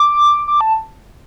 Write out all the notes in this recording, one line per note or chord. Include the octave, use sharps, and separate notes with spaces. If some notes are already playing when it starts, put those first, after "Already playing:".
Already playing: D6
D6
A5